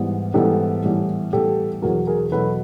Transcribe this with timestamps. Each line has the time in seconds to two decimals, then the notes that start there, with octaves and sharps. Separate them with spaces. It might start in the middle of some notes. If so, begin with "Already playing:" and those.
Already playing: G#2 E3 G3 B3
0.34 G#2 E3 G3 B3 G4 A4
0.83 A2 E3 G3 B3
1.33 A2 E3 G3 B3 G4 A4
1.82 E2 B2 F#3 G#4 A#4
2.07 G#4 A#4
2.32 E2 B2 F#3 A4 B4